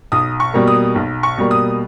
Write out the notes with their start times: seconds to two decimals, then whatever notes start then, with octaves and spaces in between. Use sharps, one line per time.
0.12 B1 D#6
0.40 C#6
0.54 B2 G3 A#3
0.67 D#6
0.95 B1
1.23 C#6
1.38 B2 G3 A#3
1.51 D#6